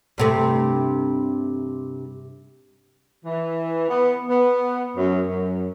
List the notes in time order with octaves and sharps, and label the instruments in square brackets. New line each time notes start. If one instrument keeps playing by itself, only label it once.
[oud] G2 C3 A3
[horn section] E3
B3
B3
F#2
F#2